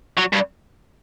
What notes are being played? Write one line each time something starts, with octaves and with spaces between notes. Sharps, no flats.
F#3
G2